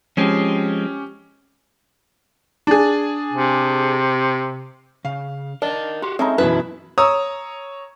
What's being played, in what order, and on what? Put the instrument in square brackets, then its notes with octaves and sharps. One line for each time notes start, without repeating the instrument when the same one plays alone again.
[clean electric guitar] F3 G#3 C4 [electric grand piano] C#4 G4
[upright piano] D4 G#4
[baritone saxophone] C3
[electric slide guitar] C#3 [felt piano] F5
[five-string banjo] D4 [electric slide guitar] A#4 D#5
[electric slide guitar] F#4 G4 [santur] C6
[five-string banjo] G#3 [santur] A3 C#4 D#4 [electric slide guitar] C4
[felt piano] F#2 B2 E3 [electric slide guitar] E4 E5 [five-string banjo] B4
[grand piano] C#5 A#5 D#6 E6